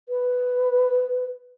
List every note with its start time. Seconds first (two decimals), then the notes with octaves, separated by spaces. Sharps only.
0.09 B4